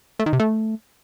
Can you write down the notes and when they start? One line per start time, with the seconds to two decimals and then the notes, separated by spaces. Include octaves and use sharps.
0.19 A3
0.26 D#3
0.33 C3
0.40 A3